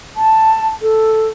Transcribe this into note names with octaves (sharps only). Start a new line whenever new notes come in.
A5
A4